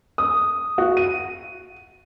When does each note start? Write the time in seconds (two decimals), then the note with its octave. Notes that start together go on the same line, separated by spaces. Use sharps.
0.18 D#6
0.78 F#4
0.97 D#7